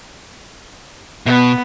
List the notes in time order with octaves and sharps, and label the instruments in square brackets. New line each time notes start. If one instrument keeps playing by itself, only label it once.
[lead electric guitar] B2 [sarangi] B3